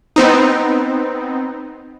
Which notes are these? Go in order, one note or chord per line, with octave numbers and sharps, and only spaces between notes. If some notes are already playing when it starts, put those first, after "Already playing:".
B3 C4 D#4